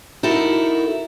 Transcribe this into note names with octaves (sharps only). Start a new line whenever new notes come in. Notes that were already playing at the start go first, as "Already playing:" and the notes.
D#4 E4 F#4 A4 A#4